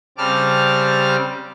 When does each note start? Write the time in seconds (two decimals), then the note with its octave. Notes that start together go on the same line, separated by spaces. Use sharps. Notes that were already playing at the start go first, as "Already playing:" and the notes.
0.18 C#3 G3 C4 A5 D6 F6